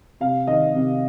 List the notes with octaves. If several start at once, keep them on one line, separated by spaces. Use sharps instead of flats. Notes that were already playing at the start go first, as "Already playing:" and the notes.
C3 F5
D#3 D#5
C3